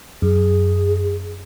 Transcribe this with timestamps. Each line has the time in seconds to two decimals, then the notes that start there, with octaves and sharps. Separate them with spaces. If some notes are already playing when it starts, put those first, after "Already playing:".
0.22 F#2 G#4